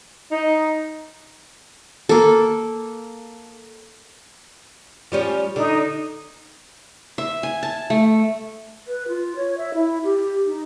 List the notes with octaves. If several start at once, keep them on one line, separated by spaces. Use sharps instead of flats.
D#4
A#3 A4
F3 G3 C#4
D3 D#4
E5
G#5
A5
A3
B4
F4
C#5
E5
E4
G4
D#4